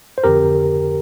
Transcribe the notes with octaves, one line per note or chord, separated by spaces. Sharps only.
C5
F2 D3 G4 A#4